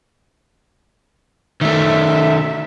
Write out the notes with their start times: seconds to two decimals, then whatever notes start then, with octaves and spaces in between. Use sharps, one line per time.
1.61 D#3 A3 E5